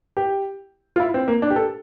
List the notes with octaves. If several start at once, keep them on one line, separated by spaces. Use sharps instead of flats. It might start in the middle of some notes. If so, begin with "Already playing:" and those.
G4
F4
E4
C4
A#3
D4
G4
A4